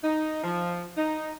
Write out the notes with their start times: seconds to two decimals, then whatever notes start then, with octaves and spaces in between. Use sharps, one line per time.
0.03 D#4
0.44 F3
0.97 D#4